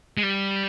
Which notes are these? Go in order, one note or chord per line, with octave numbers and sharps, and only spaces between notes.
G#3
G3